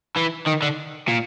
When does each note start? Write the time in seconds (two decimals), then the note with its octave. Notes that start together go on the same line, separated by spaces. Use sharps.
0.17 E3
0.47 D#3
0.62 D3
1.08 A#2